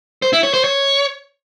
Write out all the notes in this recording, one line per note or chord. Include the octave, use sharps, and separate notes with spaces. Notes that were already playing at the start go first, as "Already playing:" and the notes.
C5
E4
C#5
C5
C#5